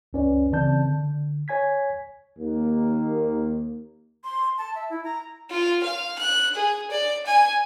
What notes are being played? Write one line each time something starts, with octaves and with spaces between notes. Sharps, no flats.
C#2 F#2 C#4 B4 D5
C#3 E3 C4 D5 A5 G6
D3
C#5 G#5 G#6 B6
D#2 A#3
C6
A5
E5
E4
A#5
F4
F5
F#6
G#4
D5
G#5